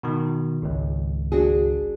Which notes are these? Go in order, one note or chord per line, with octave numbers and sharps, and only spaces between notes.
B2 D#3
G#1 C#2
D4 F#4 G#4